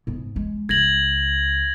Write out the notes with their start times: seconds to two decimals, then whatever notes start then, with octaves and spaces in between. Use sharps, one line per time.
0.07 G#2 B3
0.36 G#3
0.69 C#2 G#6 A#6 F#7